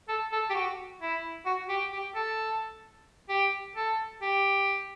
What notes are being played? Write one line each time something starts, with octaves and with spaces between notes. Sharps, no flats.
A4
A4
G4
F#4
E4
F#4
G4
G4
A4
G4
A4
G4